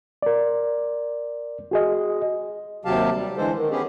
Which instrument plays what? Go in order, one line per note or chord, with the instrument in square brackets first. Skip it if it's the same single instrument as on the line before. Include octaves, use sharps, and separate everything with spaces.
[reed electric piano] A#4 D5
F#4 G#4 D#5
[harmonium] D#2 C3 F#3 G4 F5 A5
G3
D3 E3 G#3 A4 C5
D#3
B3 C#4 G4 G#4